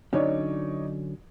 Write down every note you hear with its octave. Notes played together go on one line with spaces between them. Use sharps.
D3 F#3 C#4 D#4 C#5 D5